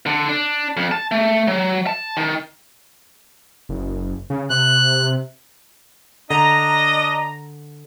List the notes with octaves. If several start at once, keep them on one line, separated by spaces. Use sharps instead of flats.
D3
D4
F2
A5
A3
F#3
A5
D#3
F#1
C#3
C3 F#6
D3 D4 D#5 A#5